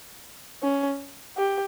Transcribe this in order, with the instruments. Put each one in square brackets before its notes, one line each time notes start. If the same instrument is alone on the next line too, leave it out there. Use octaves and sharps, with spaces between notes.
[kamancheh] C#4
G4